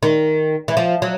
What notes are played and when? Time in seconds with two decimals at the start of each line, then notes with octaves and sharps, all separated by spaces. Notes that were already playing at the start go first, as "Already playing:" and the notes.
0.03 D#3
0.68 E3
0.77 F3
1.02 F#3